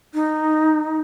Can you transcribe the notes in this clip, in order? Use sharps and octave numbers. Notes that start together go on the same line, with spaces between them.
D#4